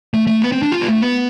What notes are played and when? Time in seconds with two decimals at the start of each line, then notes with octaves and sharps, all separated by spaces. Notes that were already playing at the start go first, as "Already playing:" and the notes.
0.14 A3
0.27 A3
0.42 B3
0.52 C4
0.62 D4
0.72 F4
0.81 B3
0.86 A3
1.01 B3